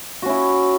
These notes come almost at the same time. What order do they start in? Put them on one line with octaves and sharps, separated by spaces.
F#4 C#4 E4